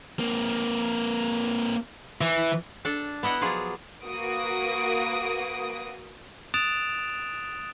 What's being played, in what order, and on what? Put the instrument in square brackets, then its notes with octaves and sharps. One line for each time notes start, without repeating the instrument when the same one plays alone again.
[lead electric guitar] A#3 C4
E3
[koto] D4 A4 D5
B3 E4 D#5 F#5
F3 F#3 F4 G#4 D5
[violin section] A#3 F#4 B4 D#6 D7
[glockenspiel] D#6 F#6 A6 D7 E7 F7